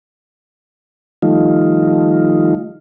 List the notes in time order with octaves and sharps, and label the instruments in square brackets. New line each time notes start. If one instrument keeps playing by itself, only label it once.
[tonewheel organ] D#3 F3 G3 A3 D#4 F4